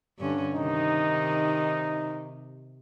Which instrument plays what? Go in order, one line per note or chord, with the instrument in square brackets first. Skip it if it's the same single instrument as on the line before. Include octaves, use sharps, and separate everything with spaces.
[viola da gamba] G2 D3 C#4
[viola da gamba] C3 D#3 [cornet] D#4